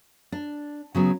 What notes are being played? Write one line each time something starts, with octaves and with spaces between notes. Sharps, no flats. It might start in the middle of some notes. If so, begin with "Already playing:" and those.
D4
C#3 F#3 B3